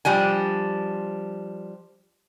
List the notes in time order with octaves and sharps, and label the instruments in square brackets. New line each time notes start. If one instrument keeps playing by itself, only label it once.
[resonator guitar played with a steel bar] F3 G3 D4 G#5